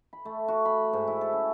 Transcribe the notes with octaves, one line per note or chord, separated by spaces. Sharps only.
B5
A3
F#4
B5
G#2
E4
A4
C#4